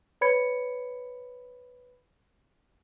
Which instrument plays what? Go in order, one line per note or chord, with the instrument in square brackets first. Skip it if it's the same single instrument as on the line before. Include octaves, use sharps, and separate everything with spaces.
[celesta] B4 C#5 B5 G#6 C#7